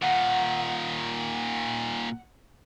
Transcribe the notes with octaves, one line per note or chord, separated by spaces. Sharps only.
A#2 D#3 F#5